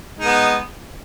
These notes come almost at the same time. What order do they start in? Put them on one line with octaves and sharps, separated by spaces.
G#3 D#4 B3